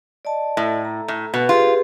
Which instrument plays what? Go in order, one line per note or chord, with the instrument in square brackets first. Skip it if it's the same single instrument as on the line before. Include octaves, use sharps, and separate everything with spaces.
[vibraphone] D5 D#5 A5
[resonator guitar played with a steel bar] A2
[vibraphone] A#5
[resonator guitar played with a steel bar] A2
[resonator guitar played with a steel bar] B2 [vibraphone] B4
[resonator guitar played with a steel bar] F4 [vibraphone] G4 G#4 B4